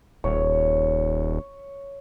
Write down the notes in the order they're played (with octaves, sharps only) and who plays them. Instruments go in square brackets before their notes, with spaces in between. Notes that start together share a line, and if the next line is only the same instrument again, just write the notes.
[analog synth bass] D#1 [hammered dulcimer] C#5